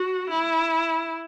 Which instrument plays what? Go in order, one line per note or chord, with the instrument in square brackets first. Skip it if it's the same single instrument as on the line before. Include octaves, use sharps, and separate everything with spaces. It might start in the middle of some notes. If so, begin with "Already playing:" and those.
Already playing: [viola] F#4
E4